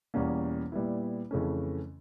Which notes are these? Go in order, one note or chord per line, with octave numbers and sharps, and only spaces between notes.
E2 B2 G3 A#3 C#4
A#2 G3 B3 E4
F2 C#3 E3 A3 C#4